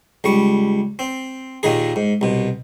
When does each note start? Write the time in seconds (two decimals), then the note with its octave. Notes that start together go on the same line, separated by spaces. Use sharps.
0.24 C#2 G3 C#6
0.99 C4
1.63 D#2 A#2 D#3 G#4
1.96 G#2
2.21 C2 B2